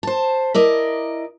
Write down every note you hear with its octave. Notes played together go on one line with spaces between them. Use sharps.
C5 A5
E4 A#4 D5 D#5